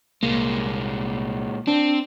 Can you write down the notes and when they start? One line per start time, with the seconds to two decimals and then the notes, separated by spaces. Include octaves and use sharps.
0.23 C2 A#2 G#3 A#3
1.67 C4 D4